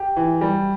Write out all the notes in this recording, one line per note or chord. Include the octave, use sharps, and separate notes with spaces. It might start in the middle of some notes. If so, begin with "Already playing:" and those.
Already playing: G4
E3
G3